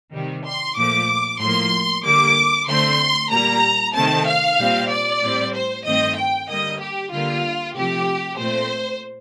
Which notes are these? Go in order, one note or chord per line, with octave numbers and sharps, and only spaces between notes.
C3 D#3 G3
C6
A#2 F3 A3 D6
A2 F3 A#3 C6
D3 G3 A#3 D6
D3 A3 C4 C6
A#2 G3 A#3 A#5
C3 D#3 A3 C4 A5
F5
A#2 G3 C4
D5
A2 G3 C4
C5
G2 D#3 A3 C4 D#5
G5
D3 G3 A#3 D#5
G4
D3 G3 A#3 F4
C3 F3 A3 G4
A#2 A3 C4 C5